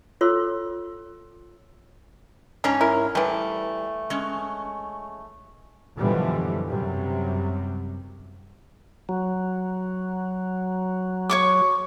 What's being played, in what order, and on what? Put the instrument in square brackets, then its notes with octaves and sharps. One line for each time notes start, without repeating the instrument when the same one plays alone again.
[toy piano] F4 F#4 A4 C#5 C6 E6
[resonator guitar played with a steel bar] G#2 C#4 A#5 [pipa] D4
[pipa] E4 A#4
[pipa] E3 A3 [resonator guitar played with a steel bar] G3
[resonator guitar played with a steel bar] G#3 C#4
[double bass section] F#2 B2 D3 E3 F3 G3
F#2 C3 F#3 G3
[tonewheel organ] F#3
[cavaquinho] C#5 C#6 D6